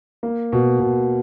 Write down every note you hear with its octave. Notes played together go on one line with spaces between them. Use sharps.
A#3
B2
B2